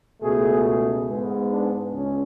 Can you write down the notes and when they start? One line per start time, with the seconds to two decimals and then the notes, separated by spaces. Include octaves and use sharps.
0.21 C#2 B2 A3 G#4
1.07 G#2 G#3 B3
1.50 D4
1.93 C#2 C#4